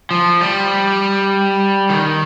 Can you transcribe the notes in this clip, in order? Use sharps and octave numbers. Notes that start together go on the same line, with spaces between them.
F3
G3
D#3